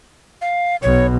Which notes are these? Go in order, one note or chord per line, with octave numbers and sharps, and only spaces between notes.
F5
B1 B2 C#5